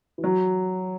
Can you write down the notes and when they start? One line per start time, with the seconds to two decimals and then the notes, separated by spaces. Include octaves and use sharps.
0.18 E3
0.24 F#3